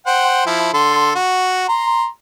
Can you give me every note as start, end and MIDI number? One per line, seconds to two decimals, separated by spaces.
0.06 0.44 72
0.06 0.44 78
0.06 0.44 79
0.46 0.73 53
0.46 0.73 64
0.74 1.13 50
0.74 1.13 69
0.74 1.13 84
1.15 1.68 66
1.68 2.06 82
1.68 2.06 84